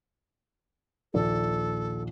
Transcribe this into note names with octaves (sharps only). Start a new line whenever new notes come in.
A#1 D#2 A4 D5